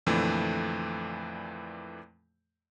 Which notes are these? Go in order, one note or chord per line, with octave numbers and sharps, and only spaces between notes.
F2 A#2 D3 E3 A3